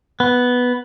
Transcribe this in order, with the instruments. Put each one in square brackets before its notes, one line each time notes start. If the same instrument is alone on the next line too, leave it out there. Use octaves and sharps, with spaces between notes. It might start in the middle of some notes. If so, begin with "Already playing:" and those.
[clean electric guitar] B3